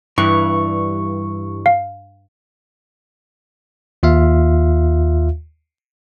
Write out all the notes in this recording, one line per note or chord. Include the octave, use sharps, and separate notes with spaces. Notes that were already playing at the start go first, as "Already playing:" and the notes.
G2 E3 C#6
F5
D#2 F4 E5 F5